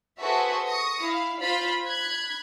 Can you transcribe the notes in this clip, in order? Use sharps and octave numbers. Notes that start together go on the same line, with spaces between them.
F#4 G#4 A4 B4 C5 E5
C#6 D#6 A#6 C#7
E4 F5
F4 C5 B5
B5 F#6 G#6